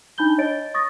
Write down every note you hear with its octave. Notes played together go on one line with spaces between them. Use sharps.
D4 D#4 B5 G6 G7
C#5 D#5 A6 D7
C#6 D#6 A6 A#6